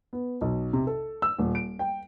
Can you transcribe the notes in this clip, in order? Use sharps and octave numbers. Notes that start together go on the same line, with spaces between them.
B3
B1
C3
A4
E6
D#1
D7
G5